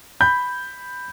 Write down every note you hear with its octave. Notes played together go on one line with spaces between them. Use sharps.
B5 G6